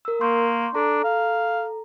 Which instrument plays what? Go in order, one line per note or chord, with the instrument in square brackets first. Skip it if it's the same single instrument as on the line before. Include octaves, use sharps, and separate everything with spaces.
[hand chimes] A#4 E6
[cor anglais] A#3 [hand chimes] C6 C#6 G6
[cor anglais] D4 [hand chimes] A4 A#5
[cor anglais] F5